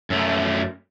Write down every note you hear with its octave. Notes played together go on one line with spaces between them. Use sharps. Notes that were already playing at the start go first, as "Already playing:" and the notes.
F#2 A3